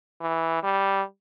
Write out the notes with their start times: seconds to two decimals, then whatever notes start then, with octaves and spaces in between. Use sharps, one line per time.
0.21 E3
0.63 G3